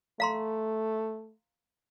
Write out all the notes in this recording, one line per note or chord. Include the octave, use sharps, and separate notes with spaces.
A3 F5 A#5 C6